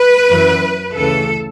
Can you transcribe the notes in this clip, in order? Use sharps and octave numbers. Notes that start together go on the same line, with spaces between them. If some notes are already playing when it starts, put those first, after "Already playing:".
Already playing: B4
F#2 E3
D2 C#3 E3 A4